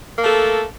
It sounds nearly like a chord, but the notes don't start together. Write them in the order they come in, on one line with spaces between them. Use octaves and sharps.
A#3 A3 A4